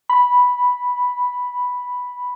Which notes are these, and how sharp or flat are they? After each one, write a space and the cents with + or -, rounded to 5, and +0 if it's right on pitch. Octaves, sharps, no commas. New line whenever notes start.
B5 -5